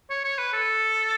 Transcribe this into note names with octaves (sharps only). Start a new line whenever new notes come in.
C#5
C#5
B4
A4